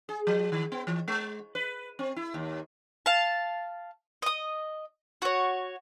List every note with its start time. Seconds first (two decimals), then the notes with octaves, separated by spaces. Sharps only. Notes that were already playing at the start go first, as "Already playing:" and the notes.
0.09 G#4
0.27 F3
0.52 D#3
0.72 B3
0.87 E3
1.08 G#3
1.55 B4
1.99 C4
2.16 E4
2.34 D#2
3.06 F5 A5
4.22 D#5 D#6
5.22 F#4 C#5